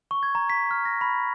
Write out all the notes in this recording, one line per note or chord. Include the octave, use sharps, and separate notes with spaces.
C#6
G#6
A#5
B6
F6
A#6
B5